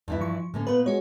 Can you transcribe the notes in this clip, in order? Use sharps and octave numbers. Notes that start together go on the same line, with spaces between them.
E2 G2 E3 E4
F3 C#6
A2 D3 A#3 C#4
A#2 B3 B4
G#3 F#4 C#5